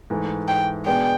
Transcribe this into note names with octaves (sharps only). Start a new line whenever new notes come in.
G#2 E3 A3
G5
B2 G#3 B3 D4 G5